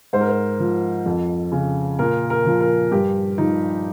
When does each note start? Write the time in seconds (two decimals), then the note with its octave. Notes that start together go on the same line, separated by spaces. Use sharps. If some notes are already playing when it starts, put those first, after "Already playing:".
0.13 G#2 C5
0.21 A#4
0.29 C5
0.60 F3
1.06 F2
1.52 C#3
1.99 A#2 A#4
2.30 A#4
2.46 F3
2.61 A#4
2.91 G2 G4
3.38 F3 D#4